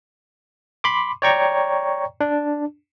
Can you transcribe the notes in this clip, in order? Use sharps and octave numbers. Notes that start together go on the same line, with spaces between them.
B5 C6 D6
C#5 D5 G5 A#5 C#6
D4